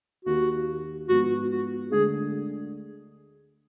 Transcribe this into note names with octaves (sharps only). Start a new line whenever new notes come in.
D#2 D#3 A#3 F#4
G#2 F3 B3 F#4
F#4
D2 D3 G#3 G#4